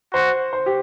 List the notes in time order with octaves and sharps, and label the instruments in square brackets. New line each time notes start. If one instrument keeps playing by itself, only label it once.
[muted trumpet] F#4 [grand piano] C5
[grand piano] C5
G4